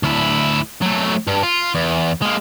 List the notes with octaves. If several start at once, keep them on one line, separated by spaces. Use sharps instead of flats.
D2 E4
F#3 A3
G2
F4
E2
G#3 A#3